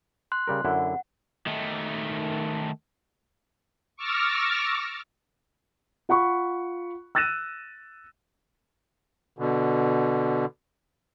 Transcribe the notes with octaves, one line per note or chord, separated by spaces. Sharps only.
C6 F#6
C#3 G3 A#4
F#2 D3 E4 F#5
D#3 A3
C#6 D6 E6 F6 A6 A#6
F4 F#5 B5 C#6
E6 F#6 A6 A#6 D#7 E7
B2 D3